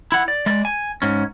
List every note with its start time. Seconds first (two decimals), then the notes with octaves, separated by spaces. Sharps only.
0.12 E4 F#5
0.28 D5
0.46 G#3 D5
0.65 G#5
1.02 G#2 C#4